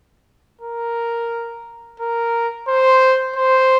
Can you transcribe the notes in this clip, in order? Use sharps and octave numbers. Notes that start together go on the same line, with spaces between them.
A#4
A#4
C5
C5